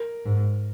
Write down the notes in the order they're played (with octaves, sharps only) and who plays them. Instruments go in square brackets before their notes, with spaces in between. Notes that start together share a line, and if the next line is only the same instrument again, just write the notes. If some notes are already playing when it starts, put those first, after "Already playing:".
Already playing: [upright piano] A#4
[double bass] G#2